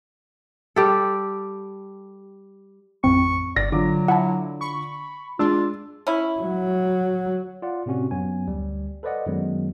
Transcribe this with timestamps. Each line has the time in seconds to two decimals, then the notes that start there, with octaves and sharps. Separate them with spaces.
0.76 G3 G4 A4
3.04 A1 F2 C4 C#6
3.56 G1 D5 A#6
3.72 D3 F#3 F4 D6
4.08 E4 F#5 A5
4.61 B5 C#6
5.39 G#3 D4 F4 E6
6.07 C#4 E4
6.41 F#3
7.62 F4 D5 F#5
7.86 A2 C3 C4 C#4 F#4
8.11 F#2 F#3 B3 G#5
8.47 D2 G3
9.03 A4 B4 C5 D5 D#5 F#5
9.26 F#2 D#3 F#3 G#3 B3